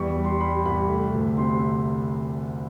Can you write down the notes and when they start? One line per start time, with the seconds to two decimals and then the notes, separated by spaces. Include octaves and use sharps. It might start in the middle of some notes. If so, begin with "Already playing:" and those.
Already playing: E2 G3 C#6
0.16 G3
0.24 C6
0.41 G3 B5
0.65 C2 B5
0.89 A3
1.14 D2
1.37 C3 C6